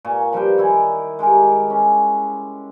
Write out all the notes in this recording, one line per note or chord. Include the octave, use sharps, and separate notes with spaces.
A#2 A#3 G#5 C#6
F3 G3 B4 G5
D#3 E4 D5 G#5
G#3 G4 A4 A#4
C#4